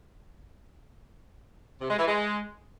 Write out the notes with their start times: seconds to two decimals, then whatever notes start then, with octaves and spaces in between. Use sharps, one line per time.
1.81 C3
1.90 G#3
1.99 E3
2.08 G#3